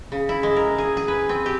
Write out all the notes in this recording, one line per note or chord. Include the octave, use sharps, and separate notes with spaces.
C#3
E4
G#3
A#4
G#4
G#4
B4
C4
G4